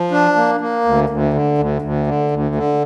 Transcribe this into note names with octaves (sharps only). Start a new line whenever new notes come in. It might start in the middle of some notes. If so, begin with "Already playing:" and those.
Already playing: F3
D4
A#3
A#3
D2
D2
D3
D2
D2
D3
D2
D3